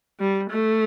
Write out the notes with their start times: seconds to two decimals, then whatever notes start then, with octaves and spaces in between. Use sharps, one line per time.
0.20 G3
0.50 A3